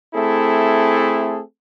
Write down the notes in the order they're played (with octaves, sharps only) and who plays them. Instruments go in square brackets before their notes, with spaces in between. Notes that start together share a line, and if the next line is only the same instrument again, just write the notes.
[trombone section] A3 C4 E4 G#4 A4